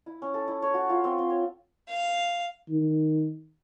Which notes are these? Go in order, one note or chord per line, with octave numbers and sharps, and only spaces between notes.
E4
C#4
A4
E4
C#5
F#4
F4
C4
C4
C#5
F5
D#3